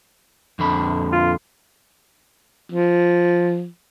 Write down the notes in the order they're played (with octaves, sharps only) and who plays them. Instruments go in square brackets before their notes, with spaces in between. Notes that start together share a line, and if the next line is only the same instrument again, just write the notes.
[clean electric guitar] F2 D3 B5
[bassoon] F4
[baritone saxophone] F3